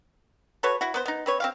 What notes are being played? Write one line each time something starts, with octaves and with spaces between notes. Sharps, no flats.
F#4 A4 B4 C#5
E4 F#4
B3 B4 C5
B3 D#4
C4 B4 C#5
C4 G4 F5